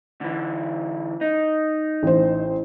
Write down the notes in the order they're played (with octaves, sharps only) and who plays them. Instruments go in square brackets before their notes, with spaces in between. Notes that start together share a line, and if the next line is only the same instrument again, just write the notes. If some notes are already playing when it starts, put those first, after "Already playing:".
[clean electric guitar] D3 E3
D#4
[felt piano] A1 C5